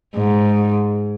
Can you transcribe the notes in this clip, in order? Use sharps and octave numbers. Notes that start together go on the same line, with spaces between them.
G#2